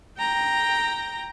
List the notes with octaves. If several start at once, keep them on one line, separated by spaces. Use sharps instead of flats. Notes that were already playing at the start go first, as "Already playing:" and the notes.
G5 A#5